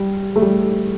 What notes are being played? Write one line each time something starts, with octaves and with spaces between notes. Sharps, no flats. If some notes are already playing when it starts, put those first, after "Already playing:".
Already playing: G3
A3
G3